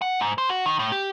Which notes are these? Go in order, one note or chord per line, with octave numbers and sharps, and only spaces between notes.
F#5
G#2
C5
F#4
D#3
A2
G4